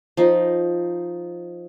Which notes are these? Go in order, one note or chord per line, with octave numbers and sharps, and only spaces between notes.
F3 D#4